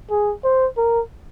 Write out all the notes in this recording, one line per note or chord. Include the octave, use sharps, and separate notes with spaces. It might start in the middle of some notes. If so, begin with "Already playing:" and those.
G#4
C5
A#4